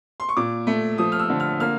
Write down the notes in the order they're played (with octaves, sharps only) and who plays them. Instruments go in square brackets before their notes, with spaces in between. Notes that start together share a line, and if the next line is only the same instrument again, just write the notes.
[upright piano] C6
C#6
A#2 D6
A3
F3 D#6
F6
E6
D3
F6
A#3 F6